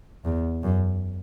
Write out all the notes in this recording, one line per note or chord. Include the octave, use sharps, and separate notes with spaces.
E2
F#2